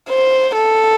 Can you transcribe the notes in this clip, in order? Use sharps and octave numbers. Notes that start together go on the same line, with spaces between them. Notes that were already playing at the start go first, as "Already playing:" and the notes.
C5
A4